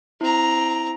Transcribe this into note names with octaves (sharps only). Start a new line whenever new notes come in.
C4 E4 A#5